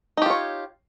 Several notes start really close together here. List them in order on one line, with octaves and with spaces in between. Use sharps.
D#4 G4 F4 C#5